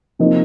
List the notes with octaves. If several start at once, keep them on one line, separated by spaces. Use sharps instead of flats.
C3 F3 A#3 D#4